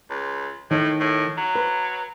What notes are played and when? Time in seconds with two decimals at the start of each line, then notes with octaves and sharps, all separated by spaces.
0.10 C#2
0.71 A2 D#3
1.00 A2
1.37 F#3
1.55 B4